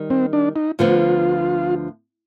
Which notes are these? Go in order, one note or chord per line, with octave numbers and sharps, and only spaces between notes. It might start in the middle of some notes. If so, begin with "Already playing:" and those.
Already playing: D#3 G3
C4
D4
D#4
D2 D3 F3 B3 F4